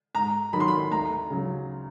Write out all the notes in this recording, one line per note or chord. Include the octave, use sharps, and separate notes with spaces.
G#2 A#5
D#3 F#3 B5
C6
B5
D2 A#5
C#3 F#3